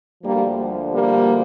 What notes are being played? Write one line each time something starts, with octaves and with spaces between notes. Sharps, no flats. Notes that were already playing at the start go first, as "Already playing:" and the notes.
D2 D3 F3 G3 A#3
G3 A#3